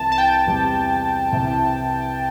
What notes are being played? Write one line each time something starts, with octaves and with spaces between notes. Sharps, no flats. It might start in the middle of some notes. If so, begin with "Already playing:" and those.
Already playing: C2 C3 E3 A5
A5
G5
E2 C3 G3
C2 C3 E3